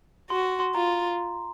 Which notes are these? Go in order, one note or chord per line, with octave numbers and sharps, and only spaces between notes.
F#4 C6
C6
F4 A#5